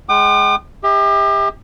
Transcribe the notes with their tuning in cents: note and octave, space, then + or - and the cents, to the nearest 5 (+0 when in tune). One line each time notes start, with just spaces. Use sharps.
G#3 +0 G5 -40 D6 +45
G4 +35 E5 -40